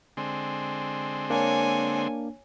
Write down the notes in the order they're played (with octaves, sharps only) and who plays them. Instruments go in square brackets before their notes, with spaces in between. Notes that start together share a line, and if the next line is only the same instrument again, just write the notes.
[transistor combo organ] D3 G#3 C4
[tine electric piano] A#3 D4 [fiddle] C#5 G#5